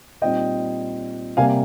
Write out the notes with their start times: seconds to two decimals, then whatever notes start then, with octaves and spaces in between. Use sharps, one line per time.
0.22 A#2 G3 C4 D#4 D#5 G5
1.37 C3 G3 A#3 F5 G#5